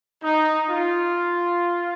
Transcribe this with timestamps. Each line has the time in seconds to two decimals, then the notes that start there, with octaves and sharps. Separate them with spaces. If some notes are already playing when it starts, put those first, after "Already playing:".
0.23 D#4
0.70 F4